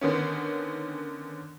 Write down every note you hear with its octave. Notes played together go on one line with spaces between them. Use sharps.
D3 D#3 B3 C#4